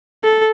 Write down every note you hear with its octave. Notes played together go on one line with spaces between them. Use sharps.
A4